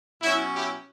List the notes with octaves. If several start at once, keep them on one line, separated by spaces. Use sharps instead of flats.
B2 F#3 C#4 E4
E4 G4